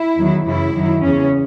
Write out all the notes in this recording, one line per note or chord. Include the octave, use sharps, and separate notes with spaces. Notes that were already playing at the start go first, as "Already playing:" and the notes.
Already playing: E4
E2 D#3 F#3
F#2 C#3 E3 E4
F#2 D#3 F#3
E2 C#3 E3 C#4